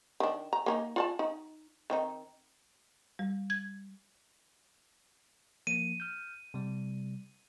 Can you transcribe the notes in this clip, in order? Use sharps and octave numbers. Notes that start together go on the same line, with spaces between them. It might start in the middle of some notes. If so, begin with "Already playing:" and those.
D#3 D4
A#5
A#3 C#4 D#4
F4 D5 A5
D#4
D#3 C4 D#4
G3
G#6
F3 A#3 D#7
F6 G6
C3 G3